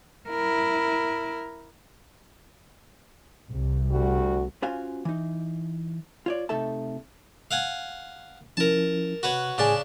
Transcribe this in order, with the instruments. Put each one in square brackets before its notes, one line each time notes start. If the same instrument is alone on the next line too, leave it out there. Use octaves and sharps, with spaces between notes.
[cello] E4 A#4
[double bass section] C2
[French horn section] D2 G3 F#4
[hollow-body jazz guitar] C#4 F4 F#4 C5 F5 G#5
E3 D#4
F4 C#5 D5
C3 A3 D#4 A4 E5 A5
[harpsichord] F5 F#5 G#5
[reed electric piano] F3 C#4 E4 [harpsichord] A#4 A5
[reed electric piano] C3 [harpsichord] F#4 B4 C#5
[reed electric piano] A2 G#4 G#5 [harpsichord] C#3 D4 A5